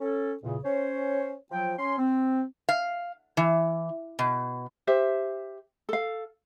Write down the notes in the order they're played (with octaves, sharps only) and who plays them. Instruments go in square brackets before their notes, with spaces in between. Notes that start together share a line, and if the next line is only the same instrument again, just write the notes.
[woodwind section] C#4 A4
E2 A#2 C#3
C#4 C5 C#5
F3 F#3 G5
C#4 C6
C4
[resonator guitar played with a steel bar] F5
E3
B2
[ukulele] G4 C5 E5
A4 F5